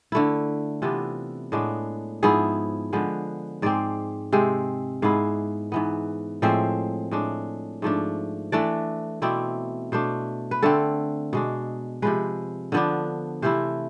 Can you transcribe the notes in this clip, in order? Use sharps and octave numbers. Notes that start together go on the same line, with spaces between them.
D3 A3 E4
C3 E3 B3 D4 F4
A2 G#3 B3 D4
G#2 F3 B3 E4 G#4
D3 F3 G#3 B3
G#2 G#3 C4 D5
C3 G#3 C4
G#2 G#3 B3 E4 F5
G#2 E3 B3
A2 F3 G#3 C4 E5
A2 G#3 D4
G#2 F3 A3 D4
E3 A3 D4 D5
B2 A3 C4 E4 D5
B2 A3 D4 C5
B4
D3 A3 C4 A4
B2 G#3 D4
C3 F3 G#3 B4
D3 F3 B3 D4
C3 E3 A3 E4 C5